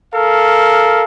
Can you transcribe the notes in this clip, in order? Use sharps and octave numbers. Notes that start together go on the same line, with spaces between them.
A4 A#4 F5